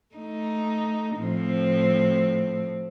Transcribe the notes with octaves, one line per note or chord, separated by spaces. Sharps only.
A3 D#4
A2 F3 C4